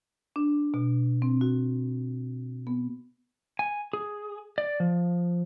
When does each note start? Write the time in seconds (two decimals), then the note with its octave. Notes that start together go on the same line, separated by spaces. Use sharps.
0.36 D4
0.74 B2
1.22 C4
1.41 F#4
2.67 B3
3.59 G#5
3.93 G#4
4.58 D5
4.80 F3